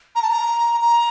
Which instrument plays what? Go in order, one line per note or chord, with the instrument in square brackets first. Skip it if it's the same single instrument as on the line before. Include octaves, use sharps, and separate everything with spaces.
[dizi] A#5
A5
A#5
A#5